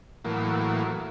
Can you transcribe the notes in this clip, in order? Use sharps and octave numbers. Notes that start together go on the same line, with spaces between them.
A2 E3 F#3 A#3